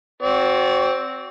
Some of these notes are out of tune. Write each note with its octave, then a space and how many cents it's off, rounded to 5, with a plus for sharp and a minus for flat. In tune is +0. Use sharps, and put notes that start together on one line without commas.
C4 +0 F#4 +0 D5 -35